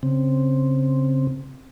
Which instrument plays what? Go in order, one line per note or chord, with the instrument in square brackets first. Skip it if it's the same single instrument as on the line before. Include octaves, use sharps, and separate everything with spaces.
[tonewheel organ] C#3 C4